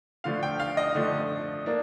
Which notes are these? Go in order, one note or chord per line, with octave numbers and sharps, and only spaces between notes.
D3 F3 A3 D4 F5
G5
F5
D#5
D3 F3 A3 D4
A#3 D4